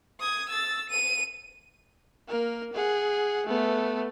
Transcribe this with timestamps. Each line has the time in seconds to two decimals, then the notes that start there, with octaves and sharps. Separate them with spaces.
0.20 D#6 G#6
0.49 E6 A6
0.90 D#7
2.28 A#3 A#4
2.73 G#4 F#5
3.47 A3 B3